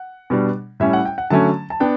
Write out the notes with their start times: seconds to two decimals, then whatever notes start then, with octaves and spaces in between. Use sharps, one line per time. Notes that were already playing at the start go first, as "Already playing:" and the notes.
Already playing: F#5
0.30 B2 G3 D4
0.80 A2 G3 C#4 E5
0.93 F#5
1.05 G5
1.18 F#5
1.30 D3 F#3 A3 C#4 A5
1.70 A5
1.80 B3 D4 G5